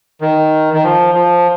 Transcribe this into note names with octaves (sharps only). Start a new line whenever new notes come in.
D#3
D#3
F3
F3